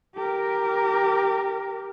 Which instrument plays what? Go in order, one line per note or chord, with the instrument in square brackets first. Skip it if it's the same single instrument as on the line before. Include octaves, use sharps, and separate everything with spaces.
[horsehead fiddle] G4 A#4